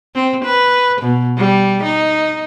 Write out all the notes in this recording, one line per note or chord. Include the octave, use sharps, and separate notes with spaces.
C4
B4
B2
G3
D#4